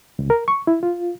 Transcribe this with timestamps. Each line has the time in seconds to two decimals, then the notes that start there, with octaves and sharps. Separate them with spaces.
0.19 C#2
0.30 A#4
0.48 C#6
0.67 E4
0.83 F4